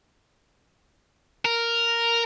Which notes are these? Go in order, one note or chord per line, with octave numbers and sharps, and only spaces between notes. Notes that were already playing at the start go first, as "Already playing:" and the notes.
A#4